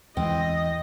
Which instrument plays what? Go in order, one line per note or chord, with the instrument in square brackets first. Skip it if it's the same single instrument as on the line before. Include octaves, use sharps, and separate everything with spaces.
[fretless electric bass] E2 E3 G#3 [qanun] C4 [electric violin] D#5